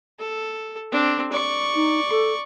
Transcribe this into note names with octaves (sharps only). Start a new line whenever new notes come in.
A4
C4 D4
D5 C#6
D#4
A4